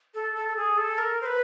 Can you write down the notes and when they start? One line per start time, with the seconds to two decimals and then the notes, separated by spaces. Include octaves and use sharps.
0.14 A4
0.36 A4
0.49 A4
0.57 G#4
0.78 A4
0.98 A#4
1.21 C5
1.26 B4